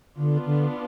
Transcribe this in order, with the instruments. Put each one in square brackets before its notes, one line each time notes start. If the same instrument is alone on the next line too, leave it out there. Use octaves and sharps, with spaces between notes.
[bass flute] D3 [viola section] B3 D4 F4
[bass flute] D3